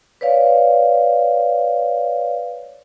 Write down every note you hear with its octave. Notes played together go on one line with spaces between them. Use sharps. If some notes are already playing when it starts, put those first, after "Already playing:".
B4 C#5 D5 F5